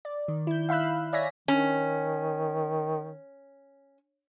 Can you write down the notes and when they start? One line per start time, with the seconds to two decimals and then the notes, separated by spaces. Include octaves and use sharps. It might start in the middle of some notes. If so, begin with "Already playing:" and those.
0.05 D5
0.28 D#3
0.47 E4 G6
0.69 E5 F5 B5 E6 F#6
1.13 C#5 D5 E5 G#5 A#6 B6
1.48 D#3 C#4